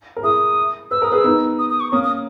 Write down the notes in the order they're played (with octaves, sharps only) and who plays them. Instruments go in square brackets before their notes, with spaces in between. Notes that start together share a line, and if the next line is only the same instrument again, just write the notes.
[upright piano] A#4
[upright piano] E4 G#4 [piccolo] D#6
[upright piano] B4 [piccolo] E6
[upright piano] A#4 [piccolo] D#6
[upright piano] G#4 B4
[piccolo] E6
[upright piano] B3 D#4
[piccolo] D#6
D#6
C#6
[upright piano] A#3 C#4 [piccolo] D#6
[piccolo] D#6